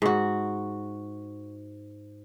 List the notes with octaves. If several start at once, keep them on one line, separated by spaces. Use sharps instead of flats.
G#2 F#4